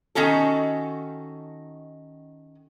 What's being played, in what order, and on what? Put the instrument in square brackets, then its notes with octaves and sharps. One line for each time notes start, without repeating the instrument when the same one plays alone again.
[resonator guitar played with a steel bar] D#3 C#4 D#4 F#4 A4